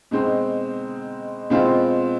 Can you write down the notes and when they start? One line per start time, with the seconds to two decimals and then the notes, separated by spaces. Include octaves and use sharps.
0.11 B2 G#3 C4 D#4
1.50 B2 G#3 C4 F4